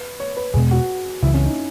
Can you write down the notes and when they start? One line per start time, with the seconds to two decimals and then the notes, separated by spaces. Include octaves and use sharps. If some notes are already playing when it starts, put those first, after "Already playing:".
Already playing: B4
0.20 C#5
0.37 B4
0.54 E2 G#4
0.57 B2 G#3
0.71 F#4
1.22 C#2 C#3 E3 E4
1.34 C#4
1.45 D#4